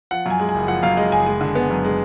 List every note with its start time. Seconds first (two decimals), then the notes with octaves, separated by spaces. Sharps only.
0.11 F3 F#5
0.26 F#2 G#5
0.39 G#3
0.49 G#5
0.54 F#1
0.68 F3 F#5
0.83 F#2 F5
0.97 G#3 D#5
1.12 F#1 G#5
1.26 G#3
1.41 D3
1.55 B3
1.70 F#2
1.84 G#3